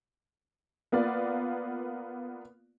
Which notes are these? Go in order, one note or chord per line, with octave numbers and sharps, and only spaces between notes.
A#3 B3 F4 D5